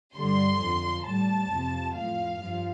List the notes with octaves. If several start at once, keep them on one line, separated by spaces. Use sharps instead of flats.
G2 D3 G3 C6
F2 F3
A2 G3 A5
F2 C3 F3
A2 F3 F5
G2 F3